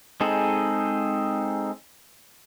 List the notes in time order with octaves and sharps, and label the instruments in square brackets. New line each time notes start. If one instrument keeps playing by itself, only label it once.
[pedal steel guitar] G#3 C4 D#4 G#4 A4